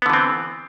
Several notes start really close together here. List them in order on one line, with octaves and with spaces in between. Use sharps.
B3 D3 E3 C4